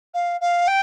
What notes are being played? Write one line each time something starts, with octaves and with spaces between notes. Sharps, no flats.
F5
F5
G5